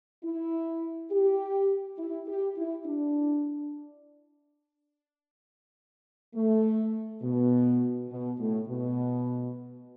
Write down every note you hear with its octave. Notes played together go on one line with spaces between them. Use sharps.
E4
G4
E4
G4
E4
D4
A3
B2
B2
A2
B2